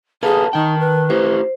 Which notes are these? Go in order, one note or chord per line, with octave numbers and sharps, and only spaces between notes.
G#4 A4 B4 F5 A5
D#3 D#4 G5
B4
A3 E4 G4 C5